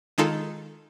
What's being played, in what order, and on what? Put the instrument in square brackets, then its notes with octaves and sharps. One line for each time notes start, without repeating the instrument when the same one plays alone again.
[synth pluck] D#3 G#3 D#4 F4 A4